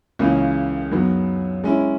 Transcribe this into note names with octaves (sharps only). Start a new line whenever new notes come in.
C#2 C#3 E3 A#3 C#4
F#2 D#3 F#3 B3
G#3 C#4 E4